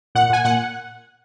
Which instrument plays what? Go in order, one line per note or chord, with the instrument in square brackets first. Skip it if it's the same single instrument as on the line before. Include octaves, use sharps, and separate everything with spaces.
[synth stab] A#2 F#5
A#2 G#5
A#2 F#5